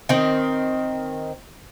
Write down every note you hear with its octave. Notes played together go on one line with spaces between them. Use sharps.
D#3 C4